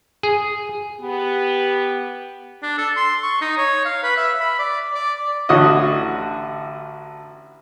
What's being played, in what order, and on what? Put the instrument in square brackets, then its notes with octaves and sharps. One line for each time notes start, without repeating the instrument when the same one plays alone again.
[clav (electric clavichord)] G#4
[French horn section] B3 G4
[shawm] D4
A4
C6
C#6
D#4
C#5
F5
B4
E5
B5
D5
D5
[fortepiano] A1 D3 F#4 C#5 D#5